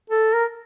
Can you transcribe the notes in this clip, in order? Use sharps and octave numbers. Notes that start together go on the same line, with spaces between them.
A4
A#4